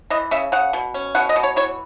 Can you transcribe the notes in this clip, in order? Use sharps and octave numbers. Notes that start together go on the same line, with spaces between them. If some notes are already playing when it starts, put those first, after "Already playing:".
E3 D#5
C#3 E5
C#3 F#5
B2
C#4
B2 F#5
D#5
B2
C#5
E3 C#5